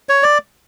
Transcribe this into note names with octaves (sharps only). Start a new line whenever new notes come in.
C#5
D5